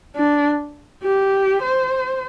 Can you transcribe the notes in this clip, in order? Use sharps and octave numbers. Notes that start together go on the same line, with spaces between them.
D4
G4
C5